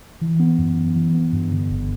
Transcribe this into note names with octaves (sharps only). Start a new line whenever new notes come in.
E3
B3
F#2
F#2
E3
B3
G2
D3
G1